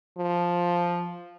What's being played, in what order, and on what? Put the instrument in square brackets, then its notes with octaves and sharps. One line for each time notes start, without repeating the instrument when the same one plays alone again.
[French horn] F3